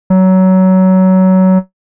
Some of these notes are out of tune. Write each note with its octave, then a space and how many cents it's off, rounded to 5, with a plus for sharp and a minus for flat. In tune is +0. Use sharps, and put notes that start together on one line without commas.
F#3 +20